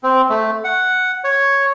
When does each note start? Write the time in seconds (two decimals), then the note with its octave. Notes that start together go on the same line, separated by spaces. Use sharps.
0.03 C4
0.30 A3
0.64 F#5
1.24 C#5